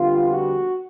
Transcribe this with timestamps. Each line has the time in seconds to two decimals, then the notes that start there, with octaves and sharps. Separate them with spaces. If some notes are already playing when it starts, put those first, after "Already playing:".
Already playing: F2 D3 G3 B3 F4
0.30 F#4